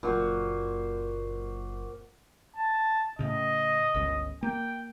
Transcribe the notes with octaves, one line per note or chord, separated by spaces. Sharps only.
F#1 F#2 A#2 F#4 C5
A5
A2 C#3 D#5
G1 C#2 C#3
A#3 G5